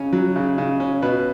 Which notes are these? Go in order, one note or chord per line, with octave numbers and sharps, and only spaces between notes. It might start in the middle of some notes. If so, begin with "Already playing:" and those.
Already playing: C#3 C#4
F#3
C#3
C#3
C#4
B2 B4